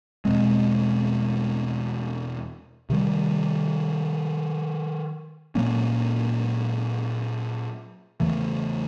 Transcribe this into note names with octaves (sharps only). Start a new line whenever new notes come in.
E2 B2 G#3 C4
C3 D#3 G3
A#2 F#3 A#3 C#4
E2 C#3 E3 A3